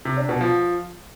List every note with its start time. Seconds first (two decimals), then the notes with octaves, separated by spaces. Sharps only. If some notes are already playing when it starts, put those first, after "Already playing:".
0.05 C3
0.17 D4
0.29 B2
0.41 F3